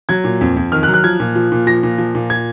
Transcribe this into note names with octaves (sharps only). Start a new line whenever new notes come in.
F#3 G#6
A#2
F2
F2
D#3 F6
F#6
F#3
F#6
F3 G#6
A#2
F3
A#2
F3 A#6
A#2
F3
A#2
G#6